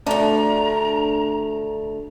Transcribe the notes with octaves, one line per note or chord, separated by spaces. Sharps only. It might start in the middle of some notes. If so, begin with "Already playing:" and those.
D2 A3 D4 A#5